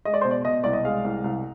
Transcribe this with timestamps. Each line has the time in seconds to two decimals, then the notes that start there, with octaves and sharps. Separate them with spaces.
0.05 G#3 D#5
0.14 D5
0.21 B2 C5
0.31 D5
0.45 B2 D#5
0.64 C2 D5
0.73 D#5
0.85 G#3 F5
1.05 C2
1.24 C2